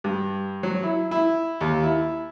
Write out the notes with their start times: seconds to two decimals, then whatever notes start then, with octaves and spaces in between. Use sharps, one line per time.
0.04 G2
0.63 F#3
0.83 E4
1.11 E4
1.61 D#2
1.83 E4